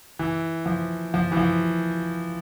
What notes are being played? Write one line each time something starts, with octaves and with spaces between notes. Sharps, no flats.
E3
F3
F3
E3
F3